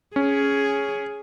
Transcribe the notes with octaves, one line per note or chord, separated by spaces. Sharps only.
C#4 G#4